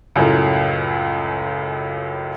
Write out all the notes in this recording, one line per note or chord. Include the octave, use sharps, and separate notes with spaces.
C#2 F#2 A2